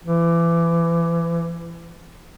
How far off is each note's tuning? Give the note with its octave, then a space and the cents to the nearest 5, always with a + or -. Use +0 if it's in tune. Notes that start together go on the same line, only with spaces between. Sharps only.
E3 +30